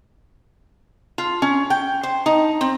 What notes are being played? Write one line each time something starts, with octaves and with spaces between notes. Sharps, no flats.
F4
C#4
G5
C5
D#4
C4